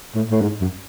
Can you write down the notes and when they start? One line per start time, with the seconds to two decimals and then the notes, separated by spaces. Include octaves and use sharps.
0.15 A2
0.31 A2
0.41 G#2
0.61 F#2